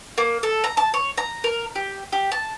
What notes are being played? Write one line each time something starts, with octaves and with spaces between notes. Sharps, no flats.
A#3
A4
A#5
A5
C#5
A#5
A#4
G4
G4
A5